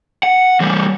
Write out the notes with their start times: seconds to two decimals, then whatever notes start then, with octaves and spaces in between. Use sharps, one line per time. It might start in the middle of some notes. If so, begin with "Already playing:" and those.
0.23 F#5
0.60 E3 G3